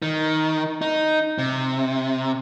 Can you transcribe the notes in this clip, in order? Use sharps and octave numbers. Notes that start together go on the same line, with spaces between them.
D#3
D#4
C3